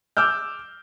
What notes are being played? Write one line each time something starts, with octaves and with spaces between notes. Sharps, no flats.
D6 E6 F6 G6